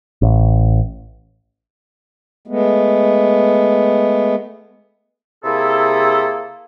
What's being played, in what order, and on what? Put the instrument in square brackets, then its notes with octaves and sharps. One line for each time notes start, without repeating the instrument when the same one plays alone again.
[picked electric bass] A1
[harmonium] G#3 A3 B3
[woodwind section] C3 A#3 E4 G#4 A4